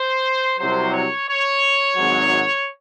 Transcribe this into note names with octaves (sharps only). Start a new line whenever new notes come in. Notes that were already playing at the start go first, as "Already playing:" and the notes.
Already playing: C5
C2 C3 F#3 C5
C#5
C#5
G#1 G#2 F#3